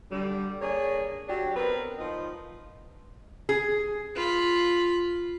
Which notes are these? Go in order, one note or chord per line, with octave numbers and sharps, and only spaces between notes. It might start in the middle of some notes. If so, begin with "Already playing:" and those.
D3 G3
A#3 D4 G#4 C#5
F#3 D4 F#4 G4
B3 C4 A#4 B4
F3 D#4 F4
G#4
F4 B5